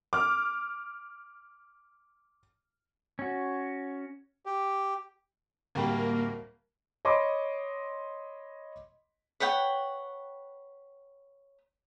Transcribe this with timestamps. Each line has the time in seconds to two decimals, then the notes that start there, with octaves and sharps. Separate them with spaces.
0.13 D6 F6
3.19 C#4 F#4
4.46 G4
5.75 D1 G3 A#3 G4
7.05 C#5 D#5 B5 C6 D6 D#6
9.40 B4 C#5 F#5 G5